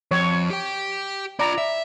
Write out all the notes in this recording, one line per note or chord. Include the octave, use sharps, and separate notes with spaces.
F2 C#5
G4 G5
F4 D5 A#5 B5
E5